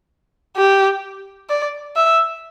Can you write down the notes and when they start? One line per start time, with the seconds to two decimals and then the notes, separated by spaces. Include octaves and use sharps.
0.57 G4
1.50 D5
1.96 E5